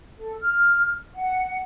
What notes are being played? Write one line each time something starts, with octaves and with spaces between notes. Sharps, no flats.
A4
F6
F#5